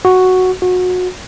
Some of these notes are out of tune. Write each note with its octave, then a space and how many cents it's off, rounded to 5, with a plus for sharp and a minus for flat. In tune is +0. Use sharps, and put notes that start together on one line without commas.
F#4 +0
F#4 -25